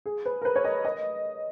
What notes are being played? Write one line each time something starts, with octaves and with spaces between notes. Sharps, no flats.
G#4
B4
A#4
B4
C#5
D#5
D#5